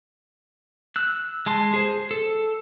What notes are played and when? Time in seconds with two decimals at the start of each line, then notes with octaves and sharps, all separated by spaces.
0.96 E6 F#6
1.46 G#3 A5 C6
1.74 G#4 C5
2.11 A4